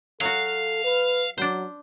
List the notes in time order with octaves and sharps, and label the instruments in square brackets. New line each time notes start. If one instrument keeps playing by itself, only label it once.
[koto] F#3 F#4 [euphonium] A4 [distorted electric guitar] F5
[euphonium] B4
[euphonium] F#3 [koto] D4 C5